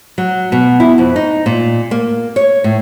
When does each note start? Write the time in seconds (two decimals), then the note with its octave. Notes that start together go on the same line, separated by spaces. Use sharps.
0.18 F#3
0.52 B2
0.80 E4
0.98 F2
1.16 D#4
1.46 A#2
1.91 A#3
2.36 C#5
2.64 A2